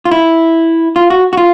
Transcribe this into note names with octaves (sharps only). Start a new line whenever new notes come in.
F4
E4
F4
F#4
F#4
F4